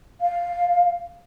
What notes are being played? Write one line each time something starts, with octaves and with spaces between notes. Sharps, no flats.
F5